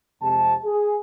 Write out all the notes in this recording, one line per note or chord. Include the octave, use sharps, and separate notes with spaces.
F2 C3 G#3 A5
G#4